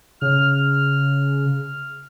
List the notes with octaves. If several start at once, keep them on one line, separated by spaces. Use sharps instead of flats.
C#3 F6